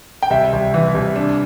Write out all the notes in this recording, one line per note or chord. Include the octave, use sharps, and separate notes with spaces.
G5
C2 E5
C2
E3
C2
D4